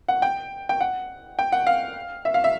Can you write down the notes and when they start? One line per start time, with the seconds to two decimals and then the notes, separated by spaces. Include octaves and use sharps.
0.08 F#5
0.22 G5
0.69 G5
0.81 F#5
1.39 G5
1.52 F#5
1.67 F5
2.25 E5
2.34 F5
2.44 E5